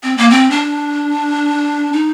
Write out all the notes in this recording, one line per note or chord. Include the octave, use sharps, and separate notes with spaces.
C4
A#3
C4
D4
D#4